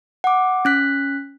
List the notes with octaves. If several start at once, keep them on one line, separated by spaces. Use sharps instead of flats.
F#5 D6
C#4 F#6 B6